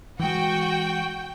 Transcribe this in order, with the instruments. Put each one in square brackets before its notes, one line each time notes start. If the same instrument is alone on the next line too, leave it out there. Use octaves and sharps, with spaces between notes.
[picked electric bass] E3 G#3 [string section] F#4 [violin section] G5